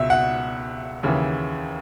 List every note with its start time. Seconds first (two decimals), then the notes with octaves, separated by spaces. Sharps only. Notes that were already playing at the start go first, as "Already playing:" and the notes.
Already playing: C#2 B2 E5
0.10 F#5
1.03 D#2 C#3 E3